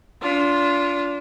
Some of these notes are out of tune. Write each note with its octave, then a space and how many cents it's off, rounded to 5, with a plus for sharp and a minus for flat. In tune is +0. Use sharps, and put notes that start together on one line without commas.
D4 -30 F4 +0